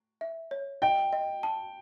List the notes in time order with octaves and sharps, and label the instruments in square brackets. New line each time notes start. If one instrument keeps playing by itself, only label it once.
[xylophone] E5
C#5
[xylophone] D#5 [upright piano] G5
[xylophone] D#5
A5